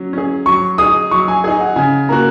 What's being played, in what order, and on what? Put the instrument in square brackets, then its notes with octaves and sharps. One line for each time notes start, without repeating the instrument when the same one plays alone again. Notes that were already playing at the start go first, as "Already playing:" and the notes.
Already playing: [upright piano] F#3 C#4
C#4 G#4
[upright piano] F#3 [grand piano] C#6
[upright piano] D#4 G#4 [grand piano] D#6
[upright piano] F#3 [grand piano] C#6
[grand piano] G#5
[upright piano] D#4 G#4 [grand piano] G#5
[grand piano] F#5
[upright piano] C#3 [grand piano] G#5
[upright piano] A#3 F#4 [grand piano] A#5